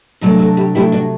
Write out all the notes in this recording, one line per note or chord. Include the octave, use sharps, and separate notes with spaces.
C3 F#3 A3 D4
F#4 A4
E4 G4
C3 F#3 A3 D4 E4 G4
D4 F#4